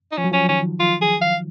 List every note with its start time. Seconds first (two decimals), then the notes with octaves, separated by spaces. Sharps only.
0.12 D#4
0.17 F3 C#4
0.24 F#3
0.31 F3 C#4
0.49 D#3 C#4
0.80 F4
1.02 G#4
1.22 F5